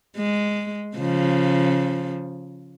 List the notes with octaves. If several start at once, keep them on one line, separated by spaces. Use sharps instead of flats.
G#3
C#3 F3